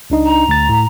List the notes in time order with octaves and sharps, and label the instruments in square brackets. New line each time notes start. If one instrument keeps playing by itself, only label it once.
[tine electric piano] C#2 D4 D#4
[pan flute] A#5
[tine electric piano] D2 A6
A2